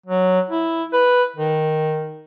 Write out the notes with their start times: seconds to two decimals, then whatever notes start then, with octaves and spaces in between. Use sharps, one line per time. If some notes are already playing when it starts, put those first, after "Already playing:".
0.06 F#3
0.50 E4
0.93 B4
1.36 D#3